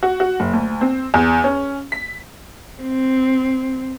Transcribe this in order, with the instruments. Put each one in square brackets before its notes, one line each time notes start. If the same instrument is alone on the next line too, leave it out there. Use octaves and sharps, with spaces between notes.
[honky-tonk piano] F#4
F#4
F#1
D2
C4
E2
C#4
B6
[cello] C4